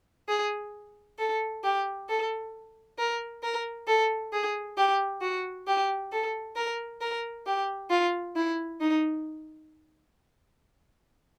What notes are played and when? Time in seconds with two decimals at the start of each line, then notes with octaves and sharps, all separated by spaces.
0.28 G#4
1.19 A4
1.64 G4
2.09 A4
2.98 A#4
3.43 A#4
3.87 A4
4.33 G#4
4.77 G4
5.21 F#4
5.67 G4
6.12 A4
6.56 A#4
7.01 A#4
7.46 G4
7.90 F4
8.36 E4
8.80 D#4